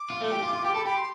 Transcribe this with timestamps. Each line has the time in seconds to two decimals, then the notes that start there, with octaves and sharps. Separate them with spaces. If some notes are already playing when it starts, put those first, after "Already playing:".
Already playing: D6
0.10 F4
0.21 A3
0.32 G4
0.42 F4
0.53 F4
0.64 G4
0.75 A4 B5
0.86 G4 B5
0.96 C6